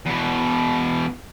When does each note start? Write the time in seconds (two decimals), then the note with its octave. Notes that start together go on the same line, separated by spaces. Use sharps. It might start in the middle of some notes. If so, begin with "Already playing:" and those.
0.06 E2 B2